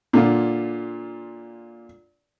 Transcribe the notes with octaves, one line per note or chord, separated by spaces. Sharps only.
A#2 D3 F4